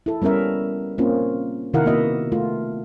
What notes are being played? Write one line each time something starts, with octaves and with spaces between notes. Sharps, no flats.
E4 A4
G3 B3 C#4 A#4 E5
A#3 C4 C#4 F4
C3 D#3 E4 A#4 F5 F#5
A#3 B3 F#4 D#5 E5
A3 F4